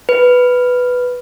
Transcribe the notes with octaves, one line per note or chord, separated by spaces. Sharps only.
B4